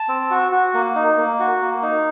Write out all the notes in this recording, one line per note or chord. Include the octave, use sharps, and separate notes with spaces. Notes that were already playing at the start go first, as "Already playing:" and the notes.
Already playing: A5
C4
F#4
F#4
A#3
D#4
A#3
F#4
A#3
D#4